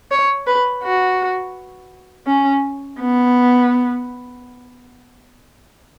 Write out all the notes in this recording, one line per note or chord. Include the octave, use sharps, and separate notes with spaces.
C#5
B4
F#4
C#4
B3